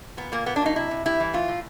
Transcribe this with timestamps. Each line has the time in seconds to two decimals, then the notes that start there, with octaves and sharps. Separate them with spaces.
0.17 A#2 B3
0.32 A#2 A#3
0.46 A#3 B3
0.56 D4
0.61 F#3 D#4
0.75 C3 E4
0.91 C3
1.06 G3 E4
1.20 E3
1.33 A2 F4
1.48 A2